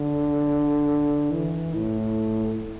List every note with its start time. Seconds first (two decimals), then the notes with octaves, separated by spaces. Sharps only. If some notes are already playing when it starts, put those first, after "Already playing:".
Already playing: D3
1.32 E3
1.75 A2